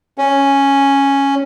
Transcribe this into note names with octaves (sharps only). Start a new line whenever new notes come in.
C#4